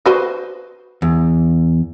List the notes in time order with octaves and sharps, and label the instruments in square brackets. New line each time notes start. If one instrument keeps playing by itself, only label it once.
[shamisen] F#4 B4 C5
[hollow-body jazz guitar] E2